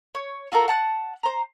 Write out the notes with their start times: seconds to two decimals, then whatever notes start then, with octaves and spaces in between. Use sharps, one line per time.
0.15 C#5
0.52 F4 F#4 A4 A#4
0.68 F#5 A5 F#6
1.23 C5 A#5